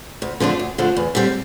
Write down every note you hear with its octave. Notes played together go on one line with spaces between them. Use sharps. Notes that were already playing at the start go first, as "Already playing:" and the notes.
D2
D3 F3 A3 D4
D2
D3 F3 A3 D4
E2
D3 G3 C4